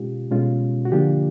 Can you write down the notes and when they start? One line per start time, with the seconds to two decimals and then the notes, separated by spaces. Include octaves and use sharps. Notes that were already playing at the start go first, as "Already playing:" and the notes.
Already playing: B2 G#3 C#4 F4 G4
0.30 B2 G#3 C#4 F4
0.85 F#4
0.92 D3 F3 A#3 D4 F4 G4